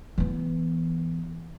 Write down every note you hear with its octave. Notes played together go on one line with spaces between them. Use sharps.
E3 B3